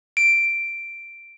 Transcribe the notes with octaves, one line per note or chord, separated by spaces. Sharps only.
D7